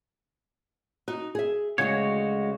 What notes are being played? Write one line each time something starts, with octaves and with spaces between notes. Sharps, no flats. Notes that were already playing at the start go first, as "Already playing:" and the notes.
D#4 F#4
G#4 E5
D2 C#3 G#3 F#4 C#5 G#6